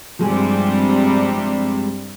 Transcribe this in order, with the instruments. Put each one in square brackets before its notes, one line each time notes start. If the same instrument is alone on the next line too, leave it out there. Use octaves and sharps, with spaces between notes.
[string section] G2 C3 G3 [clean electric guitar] F3 G#3 G#4